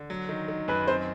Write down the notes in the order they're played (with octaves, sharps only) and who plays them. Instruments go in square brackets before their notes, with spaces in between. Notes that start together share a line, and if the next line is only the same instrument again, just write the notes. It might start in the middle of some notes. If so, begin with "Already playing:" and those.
Already playing: [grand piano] D3
F#3
D#3
D#3
[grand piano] F#2 [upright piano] B4
[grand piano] C4 [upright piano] C5